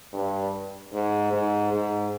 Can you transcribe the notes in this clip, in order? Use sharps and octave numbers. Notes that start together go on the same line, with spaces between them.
G2
G#2
G#2
G#2